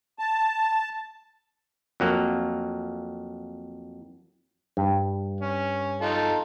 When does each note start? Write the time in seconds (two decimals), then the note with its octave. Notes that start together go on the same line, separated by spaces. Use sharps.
0.19 A5
2.00 F2 F#3 A#3
4.77 G2
5.41 C#4
6.01 D#4 F4 A4